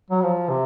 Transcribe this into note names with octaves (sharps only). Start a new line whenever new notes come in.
F#3
F3
C3